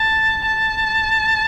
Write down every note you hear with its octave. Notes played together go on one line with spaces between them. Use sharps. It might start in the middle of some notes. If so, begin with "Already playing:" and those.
Already playing: A5
A5